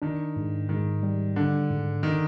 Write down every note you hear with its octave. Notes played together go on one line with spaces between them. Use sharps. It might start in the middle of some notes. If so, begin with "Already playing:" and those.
D#3 D4
G#2
G#2 D#3
G3
D3 D4
G#2
D#3